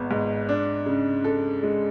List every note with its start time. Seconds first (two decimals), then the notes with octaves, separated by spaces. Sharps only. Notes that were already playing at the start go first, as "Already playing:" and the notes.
Already playing: G#1 G#3 B3
0.11 G#2
0.49 D4
0.86 C#3
1.24 A4
1.63 G#3